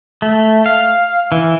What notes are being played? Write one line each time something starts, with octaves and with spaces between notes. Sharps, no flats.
A3
F5
E3